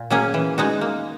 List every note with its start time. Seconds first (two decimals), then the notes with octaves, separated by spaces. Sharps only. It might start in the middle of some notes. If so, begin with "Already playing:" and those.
Already playing: A#2
0.10 F#3 A#3 C#4 G#4
0.34 E3
0.58 G#3 D#4 F#4
0.81 A#3